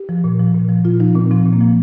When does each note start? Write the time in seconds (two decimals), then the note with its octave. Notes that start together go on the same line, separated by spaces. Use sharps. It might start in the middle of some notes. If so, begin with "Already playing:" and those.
Already playing: G4
0.09 F3
0.24 A#2
0.39 F3
0.54 A#2
0.69 F3
0.84 A#2 F4
1.00 F3 D#4
1.15 A#2 C4
1.31 F3 C4
1.46 A#2
1.53 A#3
1.61 F3